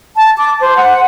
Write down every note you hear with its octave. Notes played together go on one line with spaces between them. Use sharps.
A5
D6
C5
F#5